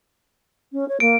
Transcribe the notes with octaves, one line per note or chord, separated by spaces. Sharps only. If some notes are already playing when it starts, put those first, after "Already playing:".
C#4
C#5
A#3 D7